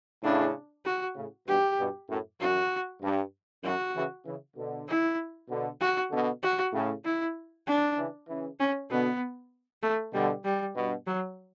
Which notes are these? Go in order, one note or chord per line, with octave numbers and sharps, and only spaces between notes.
A2 C#3 D4
F#4
A2 C#3
G2 B2 G4
G2 B2
F#2 A2
F#2 F#4
G2
F#2 F#4
C#3 E3
C#3 E3
B2 D3
E4
B2 D3
F#4
B2 D3
F#4
A2 C#3
E4
D4
C#3 E3
C#3 E3
C#4
B2 D3 B3
A3
B2 D3 G3
G3
G2 B2
F#3